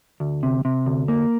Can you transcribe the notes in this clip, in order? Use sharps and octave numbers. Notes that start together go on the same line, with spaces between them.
D2
C3
C3
D2
A#3